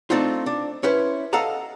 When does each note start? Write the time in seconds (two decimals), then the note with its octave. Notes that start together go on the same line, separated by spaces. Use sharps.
0.10 A3 C4 D4 D#4 F4
0.46 D4
0.83 C#4 E4 B4 C5
1.33 A4 D#5 F5 F#5 A5 A#5